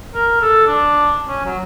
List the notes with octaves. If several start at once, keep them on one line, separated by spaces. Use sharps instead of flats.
A#4
A4
D4
C#4
F#3